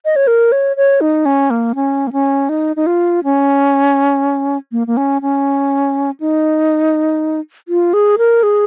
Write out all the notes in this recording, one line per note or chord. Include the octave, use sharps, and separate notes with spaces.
D#5
C#5
A#4
C#5
C#5
D#4
C#4
A#3
C#4
A#3
C#4
D#4
D#4
F4
C#4
A#3
A#3
C#4
C#4
D#4
F4
G#4
A#4
G#4